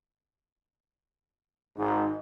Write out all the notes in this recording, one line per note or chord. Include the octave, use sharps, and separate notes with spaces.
G#1 G#2 D#4